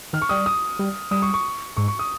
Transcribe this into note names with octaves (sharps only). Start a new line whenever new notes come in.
D#3 F6
C#6
G3 D#6
D#6
G3
G3 D#6
C#6
C#6
G#2 C#6
C#6
D#6